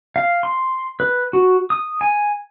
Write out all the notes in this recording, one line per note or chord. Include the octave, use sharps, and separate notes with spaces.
F5
C6
B4
F#4
D#6
G#5